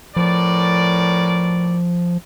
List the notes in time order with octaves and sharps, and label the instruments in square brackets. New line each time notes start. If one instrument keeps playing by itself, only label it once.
[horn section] A2 A#4 D5 [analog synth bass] F3